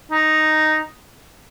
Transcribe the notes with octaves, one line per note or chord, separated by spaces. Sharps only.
D#4